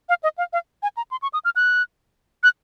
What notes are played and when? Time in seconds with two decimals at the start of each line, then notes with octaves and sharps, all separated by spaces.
0.09 F5
0.23 D#5
0.38 F5
0.53 F5
0.83 G#5
0.97 A#5
1.11 C6
1.22 C#6
1.33 D#6
1.45 F6
1.56 F#6
2.43 F#6